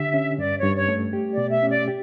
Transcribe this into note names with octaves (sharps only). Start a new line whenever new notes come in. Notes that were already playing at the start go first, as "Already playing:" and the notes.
Already playing: D3 D4 G4 E5
C#4
G2 D5
C#5
G2
C#5
A3
G4
D5
B2
E5
C#4
D5
G4